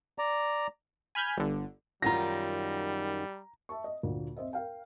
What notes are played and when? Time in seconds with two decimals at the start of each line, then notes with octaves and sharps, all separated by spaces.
0.18 D5 A#5
1.15 G#5 B5 F6 G6 G#6
1.37 G1 D3
2.02 F#2 D#3 G3 F4 A#5 A#6
3.69 E5 A5 C#6
3.84 D#5
4.03 D2 A#2 A#3
4.36 C4 C5 D#5 E5
4.53 A#4 F5 G5